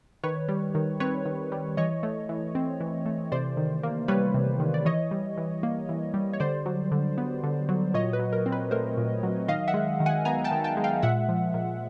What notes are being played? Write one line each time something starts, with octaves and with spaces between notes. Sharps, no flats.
D#3 B4 C#5
G3
D#3
C4 B4 C#5
D#3
G3
E3 C#5 D#5
A3
E3
C4
E3
A3
C3 C5 D5
D#3
A#3
G3 B4 C#5
C3
D#3
D5
E3 C#5 D#5
G3
E3
A#3
E3
G3
C#5
D3 C5 D5
F#3
D3
B3
D3
F#3
A#2 C#5 D#5
B4
F#3
A#4
C4
B4
A3 A#4 C5
A#2
F#3
D#3 D#5 F5
E5 F#5
G#3
D#3
F#5 G#5
B3 G#5 A#5
G5 A5
D#3
G5 A5
G#3
F5 G5
A#2 E5 F#5
F3
A#2